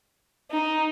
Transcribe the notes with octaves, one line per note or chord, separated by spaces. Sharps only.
D#4